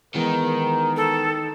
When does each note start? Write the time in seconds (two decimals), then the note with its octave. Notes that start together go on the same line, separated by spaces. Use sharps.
0.15 D#3 E3 G#3 B3 A#4
0.97 A4